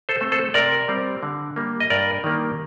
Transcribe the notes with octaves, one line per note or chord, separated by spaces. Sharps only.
A4 C5
A3 C4
A4 C5
C3 A#4 D5
G3 C4
D3
G3 A#3
D#5
G2 A#4 D5
D#3 G3 A#3